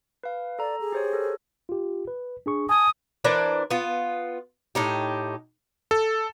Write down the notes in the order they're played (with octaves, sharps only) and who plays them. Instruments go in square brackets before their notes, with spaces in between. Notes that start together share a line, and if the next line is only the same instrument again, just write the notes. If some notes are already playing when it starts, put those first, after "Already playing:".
[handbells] B4 F5
[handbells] A4 A#5 [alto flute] D5
[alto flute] G#4
[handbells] G4 C5 C#5
A4 A#4
[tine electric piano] F4 G4
B4
D4 G#4 C#6
[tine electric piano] G#5 A5 G#6 [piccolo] D#6
[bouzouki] E3 D4 A#4 C5
B3 F4
A2 D#4 G4
[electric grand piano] A4